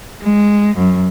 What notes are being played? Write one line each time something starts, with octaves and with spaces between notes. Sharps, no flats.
G#3
F#2